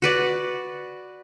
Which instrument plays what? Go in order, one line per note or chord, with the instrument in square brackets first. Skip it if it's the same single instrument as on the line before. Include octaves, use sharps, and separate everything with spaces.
[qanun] F#4 B4 D5